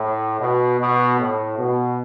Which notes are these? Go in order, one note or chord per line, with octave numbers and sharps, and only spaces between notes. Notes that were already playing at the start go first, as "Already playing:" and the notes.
Already playing: A2
B2
B2
A2
B2